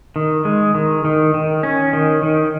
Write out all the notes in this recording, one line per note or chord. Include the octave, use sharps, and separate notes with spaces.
D#3
G#3
D#3
D#3
D#3
C#4
D#3
D#3